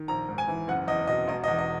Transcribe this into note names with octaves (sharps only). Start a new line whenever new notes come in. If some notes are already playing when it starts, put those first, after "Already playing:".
Already playing: D#3
A#1 A#5
G#2
G#5
E3
F#1 F#5
E2 D#5
B2 D#5
E1 D#5
D#5
E2
D#5